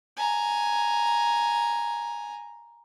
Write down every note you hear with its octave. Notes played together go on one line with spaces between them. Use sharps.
G#5 A#5